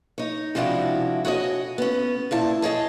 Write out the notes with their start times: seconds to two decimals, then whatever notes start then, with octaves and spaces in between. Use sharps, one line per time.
0.18 D#4 C#5
0.55 C3 F3 G#3 D4 E4 F#4
1.25 F#4 G#4 C#5 D#5
1.78 B3 C#4
2.31 A#2 E4 A5
2.62 G#4 C#5 D#5 A5